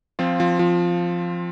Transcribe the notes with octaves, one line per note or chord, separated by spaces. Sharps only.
F3 C4 F4
F3
F3